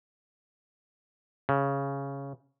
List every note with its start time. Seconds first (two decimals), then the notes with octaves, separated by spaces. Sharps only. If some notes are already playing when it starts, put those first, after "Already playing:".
1.49 C#3